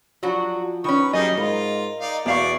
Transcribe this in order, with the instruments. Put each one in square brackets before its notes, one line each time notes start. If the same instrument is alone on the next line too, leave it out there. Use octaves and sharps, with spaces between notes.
[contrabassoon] F3 [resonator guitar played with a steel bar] F#3 D4 F#4
[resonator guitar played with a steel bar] D#3 C#4 [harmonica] B4 C#6
[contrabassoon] F#2 [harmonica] G3 D#4 G#4 [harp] D#5
[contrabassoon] G#2 [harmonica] F4 [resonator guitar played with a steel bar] A#4
[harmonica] D#4 D5 F5
[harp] E2 F5 C#6 [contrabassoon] B2 [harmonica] D5 F#5